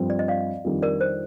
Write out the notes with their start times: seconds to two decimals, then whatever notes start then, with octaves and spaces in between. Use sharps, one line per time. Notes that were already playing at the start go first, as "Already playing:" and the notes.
Already playing: G2 F3 C4
0.10 D5
0.19 D#5
0.28 D5 F5
0.65 F2 D#3 G3 D4
0.82 A#4 D5
1.01 C5